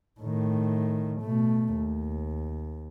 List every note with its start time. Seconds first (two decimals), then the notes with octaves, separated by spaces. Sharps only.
0.20 A2 D#3
1.21 B2 A3
1.75 D#2